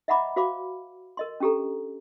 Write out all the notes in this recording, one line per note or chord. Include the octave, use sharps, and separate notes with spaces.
D#5 E5 F#5 A#5 B5 D6
F#4 C5 F5 B5 D6
A#4 D#5 C6
C#4 D4 G4 A4 A#5